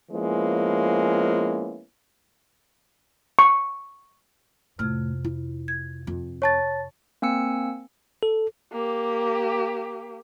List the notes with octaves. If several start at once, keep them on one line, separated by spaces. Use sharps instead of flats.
F3 G#3 A#3 B3 C#4 E4
C#6
F2 A2 C3 F6
E4
G#6
F2
C#5 A5 C#6 A6
A#3 C4 G#5 E6 C#7
A4
A#3 G4